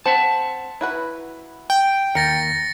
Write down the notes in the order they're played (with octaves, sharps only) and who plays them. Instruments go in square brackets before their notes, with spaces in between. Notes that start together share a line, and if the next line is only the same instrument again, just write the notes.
[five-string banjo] C4 C5 [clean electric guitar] E5 F#5 A5
[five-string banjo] E4 F#4 B4
[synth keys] G5
[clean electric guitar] D#2 [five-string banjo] A#4 [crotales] A6 A#6 C#7